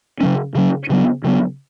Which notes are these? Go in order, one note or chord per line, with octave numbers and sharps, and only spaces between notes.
C#3 F#3 C#4
C#3 F#3 C#4
C#3 F#3 B3
C#3 F#3 B3